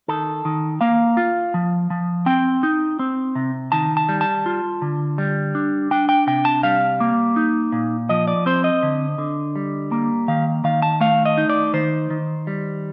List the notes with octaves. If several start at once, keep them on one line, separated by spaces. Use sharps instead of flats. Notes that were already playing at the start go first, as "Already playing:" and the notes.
D#3 A4
D#3
A#3 F5
F4
F3
F3
C4 G5
D#4
C4
C3
D#3 A5
A5
G3
A5
F4
D3
G3
D4
D4 G5
G5
C3 G5
A5
G3 F5
A#3
D#4
A#2
F3 D#5
D5
C4 C5
D#5
D3
D3
G3
A#3
D#3 F5
D#3 F5
A5
A3 F5
D#5
D#4
D5
D#3 C5
D#3
G3